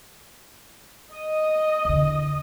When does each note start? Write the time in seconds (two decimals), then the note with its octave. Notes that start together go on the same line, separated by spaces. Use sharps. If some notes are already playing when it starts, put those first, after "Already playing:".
1.12 D#5
1.85 E2 D3